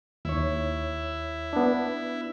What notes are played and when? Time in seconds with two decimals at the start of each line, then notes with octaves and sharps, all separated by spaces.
0.25 D#2 E4 C#5
1.53 B3 D4